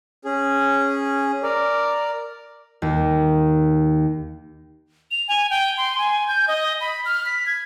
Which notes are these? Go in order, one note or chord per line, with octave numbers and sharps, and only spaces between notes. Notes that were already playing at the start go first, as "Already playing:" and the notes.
C#4 G#4
A#4 D5
D#2
F7
G#5
G5
C6
G#5
G6
D#5
B5
F6
B6
G#6